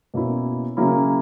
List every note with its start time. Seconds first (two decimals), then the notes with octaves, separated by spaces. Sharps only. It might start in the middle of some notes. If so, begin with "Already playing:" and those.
0.14 B2 A#3 C#4 E4
0.77 C#3 F#3 A#3 C#4 E4